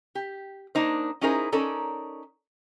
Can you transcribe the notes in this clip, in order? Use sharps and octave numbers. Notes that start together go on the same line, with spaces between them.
G4
A#3 D4 D#4 C5
C#4 D#4 E4 G#4 A#4 C5
C#4 D#4 A4 A#4 C#5 D5